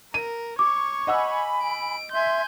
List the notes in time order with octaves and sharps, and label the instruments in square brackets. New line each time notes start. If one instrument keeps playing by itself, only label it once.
[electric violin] A#4 [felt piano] D#7
[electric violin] C#5 C#6 [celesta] D6
[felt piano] D#5 F#5 E6 [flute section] G#5 B5
[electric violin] D7
[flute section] E5 C6 [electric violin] G#5 G6